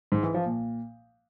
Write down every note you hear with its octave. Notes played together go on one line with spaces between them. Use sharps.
G#2
E3
F3
A#2